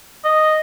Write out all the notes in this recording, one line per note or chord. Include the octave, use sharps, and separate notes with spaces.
D#5